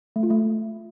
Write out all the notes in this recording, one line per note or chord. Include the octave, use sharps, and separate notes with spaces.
A3
F4
A3